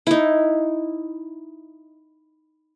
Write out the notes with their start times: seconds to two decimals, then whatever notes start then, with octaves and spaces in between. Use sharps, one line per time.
0.07 D#4 E4